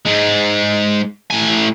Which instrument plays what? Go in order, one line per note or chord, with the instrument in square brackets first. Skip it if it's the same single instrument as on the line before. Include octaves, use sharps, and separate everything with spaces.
[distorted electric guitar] G#2 G#3
A2 G#5